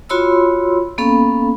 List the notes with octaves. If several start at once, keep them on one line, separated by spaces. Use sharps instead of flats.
F4 F#4 C#5 B5 C6 E6
A#3 B3 C#4 A4 F5 B5